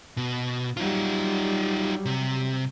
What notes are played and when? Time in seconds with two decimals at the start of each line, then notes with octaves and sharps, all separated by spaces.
0.17 B2
0.77 F#3 G3 D#4 F4
2.06 C3